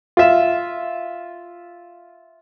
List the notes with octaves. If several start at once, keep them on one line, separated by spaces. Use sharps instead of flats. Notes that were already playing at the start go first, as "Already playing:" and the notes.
F4 E5